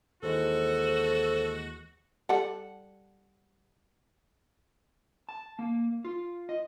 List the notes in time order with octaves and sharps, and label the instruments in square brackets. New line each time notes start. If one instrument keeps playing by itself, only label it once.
[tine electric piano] D#2 E3 G#3 [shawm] F#4 [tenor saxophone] A4 [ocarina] C5
[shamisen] G3 A4 [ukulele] F#5
[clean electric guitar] A5
A#3
F4
D#5